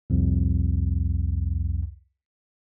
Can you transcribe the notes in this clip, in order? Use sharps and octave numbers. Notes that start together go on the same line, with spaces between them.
C2 F2